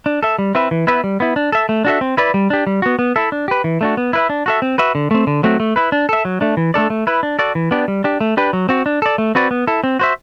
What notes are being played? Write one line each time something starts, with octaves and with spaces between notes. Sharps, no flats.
D4
A4 E5
G3
C4 E4 B4 E5
E3
B3 E4 B4 E5
G3
B3 E4
D4
A4 E5
A3
D4 F#4 A4 E5
C4
E4 B4 D5
G3
D4 G4
G3
B3 F#4
B3
E4 A4 E5
D4
G4 B4
E3
A3 D4 F#4
B3
E4 B4 E5
D4
F#4 A4 E5
C4
F#4 B4 E5
D3
A3 C4
D3
F#3 A3 C4 F#4
A3
E4 B4
D4
A4 E5
F#3
A3 D4
E3
A3 D4 A4 D5
A3
E4 B4
D4
F#4 A4 D5
E3
B3 D4 G4 D5
G3
D4 G4
A3
D4 G4 B4
F#3
C4 F#4
D4
A4 D5
A3
C4 F#4 B4 D5
B3
E4 A4
C4
F#4 C5 E5